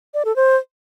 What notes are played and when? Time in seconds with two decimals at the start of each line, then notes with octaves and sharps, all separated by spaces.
0.14 D5
0.25 A4
0.36 C5